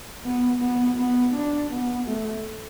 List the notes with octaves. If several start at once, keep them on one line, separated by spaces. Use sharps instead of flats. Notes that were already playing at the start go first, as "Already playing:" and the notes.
B3
B3
B3
D4
B3
A3